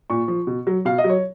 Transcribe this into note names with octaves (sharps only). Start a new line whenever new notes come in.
A#2 C#6
F3
B2
F#3
B2 F5
D#5
F#3
C#5